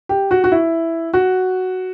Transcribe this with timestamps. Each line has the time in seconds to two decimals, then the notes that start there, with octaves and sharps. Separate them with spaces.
0.09 G4
0.31 F#4
0.44 F#4
0.52 E4
1.14 F#4